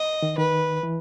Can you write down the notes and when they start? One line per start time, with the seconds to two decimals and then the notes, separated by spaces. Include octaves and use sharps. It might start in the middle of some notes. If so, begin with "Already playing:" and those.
Already playing: D#5
0.22 D#3
0.38 D#3 B4
0.83 E3